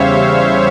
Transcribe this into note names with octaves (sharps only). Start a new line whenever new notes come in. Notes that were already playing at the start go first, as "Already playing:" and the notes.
Already playing: E2 C#3 G3 C5 C#5 E5 F5